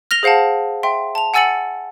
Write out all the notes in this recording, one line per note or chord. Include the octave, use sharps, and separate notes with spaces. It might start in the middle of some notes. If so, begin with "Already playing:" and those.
F6 A#6 F7 G7
G#4 C5 F5 F#5 A5
E5 G5 C6
A5 F7
F#5 G#5 E6 A6 C#7 F#7